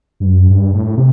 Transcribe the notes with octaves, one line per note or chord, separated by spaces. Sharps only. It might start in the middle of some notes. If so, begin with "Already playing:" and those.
G2
F#2
G2
A2
C3